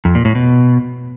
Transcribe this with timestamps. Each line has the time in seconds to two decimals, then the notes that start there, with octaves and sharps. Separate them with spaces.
0.05 F2
0.15 A#2
0.25 A2
0.35 B2